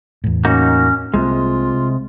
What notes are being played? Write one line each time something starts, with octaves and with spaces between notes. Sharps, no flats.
E2 A2
A#3 C#4 D#4 F#4
C2 C3 G3 G#3 A#3 F4